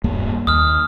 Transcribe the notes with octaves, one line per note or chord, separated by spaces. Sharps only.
D#1 G2 A#3
D#2 D#6 F6